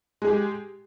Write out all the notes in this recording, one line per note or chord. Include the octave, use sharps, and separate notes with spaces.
G#3 G4 G#4